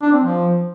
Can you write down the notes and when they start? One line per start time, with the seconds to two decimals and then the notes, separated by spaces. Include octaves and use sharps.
0.02 D4
0.13 C4
0.23 F3